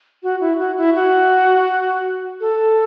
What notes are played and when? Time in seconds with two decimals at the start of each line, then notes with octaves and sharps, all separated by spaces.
0.23 F#4
0.41 E4
0.59 F#4
0.77 E4
0.95 F#4
2.41 A4